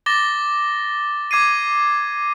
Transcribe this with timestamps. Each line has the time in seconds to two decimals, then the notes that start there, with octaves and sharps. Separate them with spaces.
0.06 D6 A6 A#6 G7
1.31 D6 G#6 C7 D#7